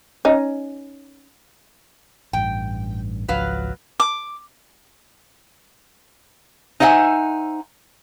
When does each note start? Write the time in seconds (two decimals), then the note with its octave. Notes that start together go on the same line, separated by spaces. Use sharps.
0.25 C#4 D#4
2.33 A1 G2 G5
3.28 G#1 C#2 F3 F#3 B4 F5
4.00 D6
6.80 D#4 C5 E5 F#5 G#5